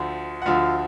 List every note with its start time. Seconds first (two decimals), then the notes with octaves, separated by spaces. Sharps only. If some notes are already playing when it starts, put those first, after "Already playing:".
Already playing: D2 D3 F3
0.42 F#5
0.46 D2 D3 F3 F4 F5